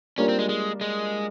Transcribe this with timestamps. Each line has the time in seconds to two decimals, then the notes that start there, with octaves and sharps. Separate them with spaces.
0.18 G3 A#3 C#4 D4 F4 A#4
0.29 C4
0.39 G#3
0.49 G#3
0.81 G#3